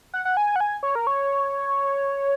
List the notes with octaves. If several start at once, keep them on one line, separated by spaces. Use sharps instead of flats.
F#5
F#5
G#5
F#5
G#5
C#5
A#4
C#5